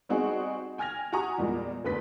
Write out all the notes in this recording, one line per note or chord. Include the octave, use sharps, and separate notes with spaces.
G3 C4 D#4 F#4 G#4
G5 G#5 F6 G#6 A#6 F7
F#4 G4 G#5 A#5 C#6 D#6
E2 A#2 G3 G#3
F1 D2 B4 B6